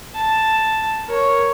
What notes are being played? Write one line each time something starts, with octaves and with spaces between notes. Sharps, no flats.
A5
A#4 C#5